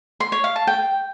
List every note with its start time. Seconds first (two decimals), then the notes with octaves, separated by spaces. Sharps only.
0.20 C6
0.32 C#5
0.44 F5
0.56 A5
0.67 G5